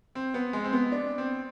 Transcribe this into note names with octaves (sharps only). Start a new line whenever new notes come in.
C4
B3
G#3
C4
B3
D4
C4